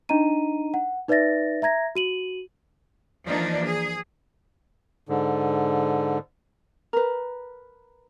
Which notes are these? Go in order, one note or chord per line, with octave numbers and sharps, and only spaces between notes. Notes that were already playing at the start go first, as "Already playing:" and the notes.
D4 D#4 D#5 A#5 D#7
F#5
D#4 B4 D5 E5 A6 A#6
E5 A#5 G#6 A#6
F#4 D#7 F#7
E3 F3 A#3 D4 D#4
G#4
G#2 D3
A#4 B4